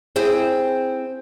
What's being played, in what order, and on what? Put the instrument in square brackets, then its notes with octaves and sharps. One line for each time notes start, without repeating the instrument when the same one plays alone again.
[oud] C4 E4 G#4